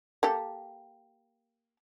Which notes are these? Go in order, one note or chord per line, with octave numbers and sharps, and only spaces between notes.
A#3 G4 A4